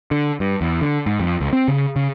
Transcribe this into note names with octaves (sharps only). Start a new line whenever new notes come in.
D3
G2
E2
D3
G#2
F2
C#2
C4
C#3
C#3